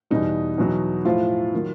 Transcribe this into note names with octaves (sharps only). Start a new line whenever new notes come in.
E2 B2 G3 D#4
E2 B2 F#3
A2 F3 F4
D#3 F#3